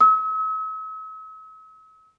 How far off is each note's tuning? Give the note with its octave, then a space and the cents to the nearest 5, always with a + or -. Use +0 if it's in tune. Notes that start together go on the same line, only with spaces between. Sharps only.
E6 -45